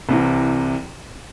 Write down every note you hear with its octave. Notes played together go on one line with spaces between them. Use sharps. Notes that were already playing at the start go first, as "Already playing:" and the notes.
C2 C3 E3